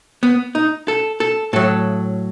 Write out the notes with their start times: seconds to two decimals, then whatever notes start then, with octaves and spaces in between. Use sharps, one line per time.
0.23 B3
0.55 D#4
0.88 A4
1.20 A4
1.53 A2 F#3 A4